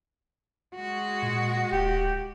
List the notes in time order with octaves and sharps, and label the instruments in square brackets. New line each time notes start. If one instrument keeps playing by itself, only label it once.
[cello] G#3 F#4
[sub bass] A#2
[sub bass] D1 [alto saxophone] G4